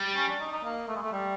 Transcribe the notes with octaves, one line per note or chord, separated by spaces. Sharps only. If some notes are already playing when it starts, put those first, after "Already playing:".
Already playing: G3
C#4
D4
D#4
D#4
A#3
A3
G#3
A3
G3